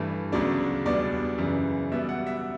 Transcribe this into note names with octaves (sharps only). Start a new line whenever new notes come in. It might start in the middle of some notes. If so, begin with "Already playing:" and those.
Already playing: G2 E3 A3
D2 C#3 F#3 B3 D4 D5
E2 B2 G3 B3 D4 D5
F#2 C#3 E3
B2 G3 B3 E5
F#5
E5